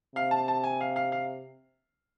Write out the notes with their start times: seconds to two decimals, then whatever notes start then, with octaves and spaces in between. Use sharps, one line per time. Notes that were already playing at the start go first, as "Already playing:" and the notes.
0.16 C3 F5
0.31 A5
0.48 A5
0.64 G#5
0.81 F5
0.96 F5
1.12 F5